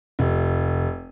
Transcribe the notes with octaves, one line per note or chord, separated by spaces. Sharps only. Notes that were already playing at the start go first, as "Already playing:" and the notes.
F1